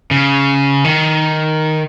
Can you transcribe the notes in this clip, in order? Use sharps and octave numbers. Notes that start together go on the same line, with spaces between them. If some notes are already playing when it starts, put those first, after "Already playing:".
C#3
D#3